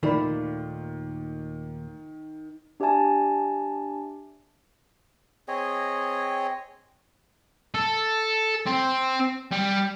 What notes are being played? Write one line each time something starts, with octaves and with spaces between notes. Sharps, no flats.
D#2 A#2 D#3 A3 A#4 D5 B5
D4 G4 D5 E5 G#5 A5
C4 G#4 C#5 D#5
A4
C4
G3